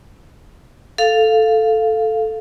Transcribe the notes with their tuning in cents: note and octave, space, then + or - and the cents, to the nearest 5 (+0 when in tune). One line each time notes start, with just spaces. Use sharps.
A4 +0 F5 +0